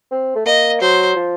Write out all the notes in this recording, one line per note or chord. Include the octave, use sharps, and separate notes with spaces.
C4
A3
A#3 D#5
F#3 C5
F3